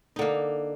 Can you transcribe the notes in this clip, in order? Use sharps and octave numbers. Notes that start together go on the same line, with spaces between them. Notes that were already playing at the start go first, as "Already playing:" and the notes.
D3 A#3 D#4